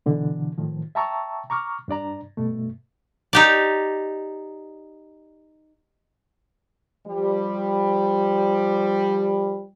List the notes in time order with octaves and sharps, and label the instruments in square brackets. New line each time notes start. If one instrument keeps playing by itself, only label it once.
[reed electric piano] B2 D3 E3
A2 D#3 F3
E5 G5 A5 A#5 C#6 E6
A#5 C#6 D6 F6
G2 D4 D5 A#5
G2 B2 A3
[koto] D#4 G4 D5
[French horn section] F3 G3